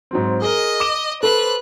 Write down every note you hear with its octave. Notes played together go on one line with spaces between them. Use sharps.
G#2 F#3 C4
G#4 A#4 D#5
D6 E7
A4 B4 C5 F#6